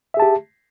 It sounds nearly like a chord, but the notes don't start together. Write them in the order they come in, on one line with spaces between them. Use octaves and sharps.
E5 G#4 A5 G4